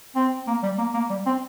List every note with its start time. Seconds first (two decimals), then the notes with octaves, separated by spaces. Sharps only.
0.16 C4
0.47 A#3
0.63 G3
0.78 A#3
0.94 A#3
1.10 G3
1.26 C4